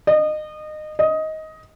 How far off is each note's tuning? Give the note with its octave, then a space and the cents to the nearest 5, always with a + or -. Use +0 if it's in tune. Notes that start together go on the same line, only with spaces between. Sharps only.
D#5 -25
D#5 +15